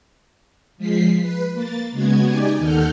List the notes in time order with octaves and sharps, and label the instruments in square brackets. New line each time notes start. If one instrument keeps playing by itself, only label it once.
[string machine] F3 G#3 B6 C7
B4
A#3 A6
C#3 G#3 B3 F#4 G#6
D#4 G4 D5 G#5
D#2 D#3 A4 F#5 F6 G6